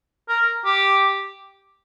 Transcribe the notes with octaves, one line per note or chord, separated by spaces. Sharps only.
A#4
G4